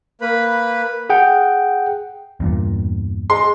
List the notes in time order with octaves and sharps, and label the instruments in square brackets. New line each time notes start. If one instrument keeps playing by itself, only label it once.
[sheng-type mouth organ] A#3 B4 B5
[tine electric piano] G#4 F#5 G5
[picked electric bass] E2 G2 A#2
[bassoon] G#3 [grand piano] C6